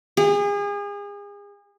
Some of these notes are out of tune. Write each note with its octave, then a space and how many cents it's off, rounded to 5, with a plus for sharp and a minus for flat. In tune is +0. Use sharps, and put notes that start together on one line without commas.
G#4 -35